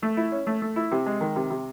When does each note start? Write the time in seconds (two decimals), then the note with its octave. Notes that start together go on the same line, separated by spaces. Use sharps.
0.02 A3
0.17 E4
0.32 C#4
0.47 A3
0.62 A3
0.76 E4
0.92 C3
1.06 G#3
1.21 D#3
1.36 C3
1.50 C3